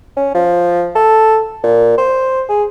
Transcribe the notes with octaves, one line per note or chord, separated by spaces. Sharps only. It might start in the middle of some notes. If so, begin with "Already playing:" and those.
C#4
F3
A4
A#2
C5
G#4